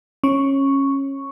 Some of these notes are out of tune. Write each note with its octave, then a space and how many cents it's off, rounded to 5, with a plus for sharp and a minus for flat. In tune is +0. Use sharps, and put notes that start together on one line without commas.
C#4 -20 C#6 +0